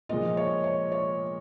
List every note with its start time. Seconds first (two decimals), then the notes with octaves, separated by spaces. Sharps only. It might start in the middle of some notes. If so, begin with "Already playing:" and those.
0.09 A#2 F3 G#3 D#5
0.37 C#5
0.64 C#5
0.92 C#5